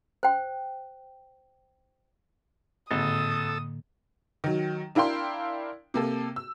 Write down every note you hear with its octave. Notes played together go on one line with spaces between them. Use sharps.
C5 G5
G#1 A2 D3 A#3 A4 D#6 E6
D#3 F#3
D4 E4 A#4 F5 G5 C6
C3 A#3 A4
E6